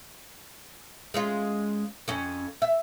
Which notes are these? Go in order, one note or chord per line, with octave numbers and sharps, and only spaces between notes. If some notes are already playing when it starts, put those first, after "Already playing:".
G#3 C#4 F4
F2 C#4
E5